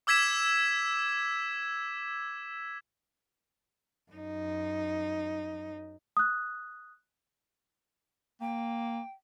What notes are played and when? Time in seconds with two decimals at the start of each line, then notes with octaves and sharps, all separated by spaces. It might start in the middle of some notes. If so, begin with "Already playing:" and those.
0.07 D6 E6 G#6 B6 E7
4.12 F#2 D#4
6.17 D#6 F#6
8.41 A#3 G5